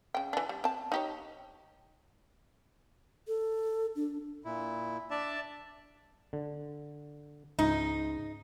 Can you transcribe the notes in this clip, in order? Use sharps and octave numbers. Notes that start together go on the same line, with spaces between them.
C#3 G5
E3 D4
G3
C4 A5
D#4 G4 C#5
A4
D4
A#2 E4
D4 D5 E5 A5
D3
C#2 G#2 D#4